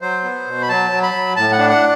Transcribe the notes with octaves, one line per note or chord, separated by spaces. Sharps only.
F#3 C5
B3
B2
B5
F#3 A5
F#3
B5
F#3
A2 A5
F#5
D4
F#5